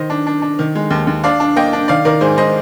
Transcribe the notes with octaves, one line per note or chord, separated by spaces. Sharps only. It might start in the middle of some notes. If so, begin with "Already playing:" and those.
Already playing: D#3 C5 D#5
D4
D4
D4
D#3
G#3
D#2
D#2
D4 D5 F5
D4
A#3 D#5 G5
D4
D#3 D5 F5
D#3 A#4 D5
G#2 G#4 C5
G#2 C5 D#5